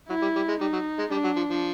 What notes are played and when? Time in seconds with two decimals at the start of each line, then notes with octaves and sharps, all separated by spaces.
0.09 F#3 E4
0.22 G3
0.35 G3
0.48 G#3
0.60 G3 D#4
0.73 F#3
0.98 G#3
1.11 G3 D4
1.24 F#3
1.36 F3
1.49 F3